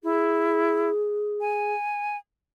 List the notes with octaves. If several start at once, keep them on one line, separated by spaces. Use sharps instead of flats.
E4 G#4
G#5